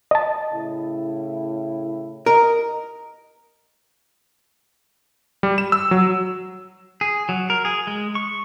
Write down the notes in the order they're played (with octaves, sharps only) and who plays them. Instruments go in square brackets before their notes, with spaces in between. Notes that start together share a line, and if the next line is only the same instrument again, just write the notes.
[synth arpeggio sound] D#5 A5
[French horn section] A2 C#3 E4
[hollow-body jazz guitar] A#4 [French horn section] D#5
[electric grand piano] G3
E7
E6
F#3
[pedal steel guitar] G#4
F#3
A#4
G#4
G#3
C#6